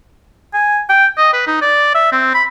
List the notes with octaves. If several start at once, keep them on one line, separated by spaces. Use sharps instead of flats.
G#5
G5
D#5
B4
D#4
D5
E5
C4
B5